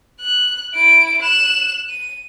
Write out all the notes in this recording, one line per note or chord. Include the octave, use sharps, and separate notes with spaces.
F#6
E4 D7
F#6 E7
D#7